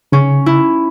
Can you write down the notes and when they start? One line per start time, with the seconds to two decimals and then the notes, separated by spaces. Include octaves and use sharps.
0.12 C#3 C#4
0.46 E4